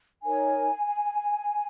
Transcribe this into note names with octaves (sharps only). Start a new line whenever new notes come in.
D#4 A#4 C#5 G#5